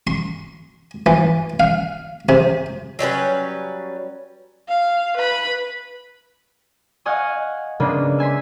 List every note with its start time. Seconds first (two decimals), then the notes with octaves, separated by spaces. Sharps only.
0.07 C6
1.06 E3
1.60 F5
2.29 C3
2.99 F#3 G3 C#4 B4
4.68 F5
5.17 B4 B5
7.05 D#5 F5 F#5 G#5 C#6 D#6
7.80 C#3 G#3 A#3 B3 D4
8.18 E5 G#5 C6 B6